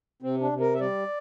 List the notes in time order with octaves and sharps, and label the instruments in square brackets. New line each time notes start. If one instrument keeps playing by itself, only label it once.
[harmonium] C3 C4
D4
C3
A#4
E5
G3 D5